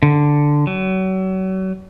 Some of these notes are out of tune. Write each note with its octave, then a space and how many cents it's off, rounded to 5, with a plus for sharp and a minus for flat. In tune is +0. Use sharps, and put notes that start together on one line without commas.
D3 +0
F#3 +35